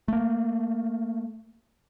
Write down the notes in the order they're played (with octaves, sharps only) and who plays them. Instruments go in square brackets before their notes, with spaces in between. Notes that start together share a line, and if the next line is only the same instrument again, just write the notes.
[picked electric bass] A3 A#3